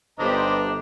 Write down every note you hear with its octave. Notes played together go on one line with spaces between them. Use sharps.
G1 D4 G4 B4 C5 D#5 A#5